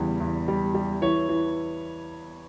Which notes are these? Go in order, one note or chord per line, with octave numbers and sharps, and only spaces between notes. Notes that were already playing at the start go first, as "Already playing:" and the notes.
Already playing: E2 C#3 G3
E2
G3
G3
E3 C#5
E3